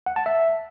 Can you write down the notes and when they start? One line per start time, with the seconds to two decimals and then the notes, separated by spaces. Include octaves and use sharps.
0.06 F#5
0.16 A5
0.26 E5